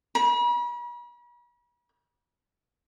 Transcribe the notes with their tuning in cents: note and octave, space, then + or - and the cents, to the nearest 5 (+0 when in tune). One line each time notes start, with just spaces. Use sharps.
B5 -45